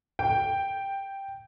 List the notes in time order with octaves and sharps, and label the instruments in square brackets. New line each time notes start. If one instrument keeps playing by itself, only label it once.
[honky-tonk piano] G5